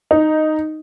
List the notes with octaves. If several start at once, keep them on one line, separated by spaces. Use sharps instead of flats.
D#4